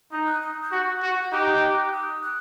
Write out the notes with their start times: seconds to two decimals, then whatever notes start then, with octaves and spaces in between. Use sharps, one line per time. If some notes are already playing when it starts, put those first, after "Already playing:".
0.12 D#4 D#6
0.26 F#6
0.42 D#6
0.62 G6
0.72 F#4 F#6
1.02 F#4
1.32 D#4 G4 F#6
1.93 D#6
2.23 F#6